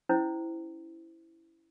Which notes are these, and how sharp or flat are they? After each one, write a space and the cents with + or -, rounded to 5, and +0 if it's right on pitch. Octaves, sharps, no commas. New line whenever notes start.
C#4 +15 E4 +0 C5 -15